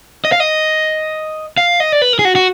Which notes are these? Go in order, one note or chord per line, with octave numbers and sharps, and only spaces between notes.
D#5
F5
D#5
F5
D#5
D5
B4
A#4
G#4
F#4
F#4